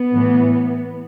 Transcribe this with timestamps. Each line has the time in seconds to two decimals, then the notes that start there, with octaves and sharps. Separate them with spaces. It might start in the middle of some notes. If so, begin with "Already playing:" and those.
Already playing: B3
0.12 A2 E3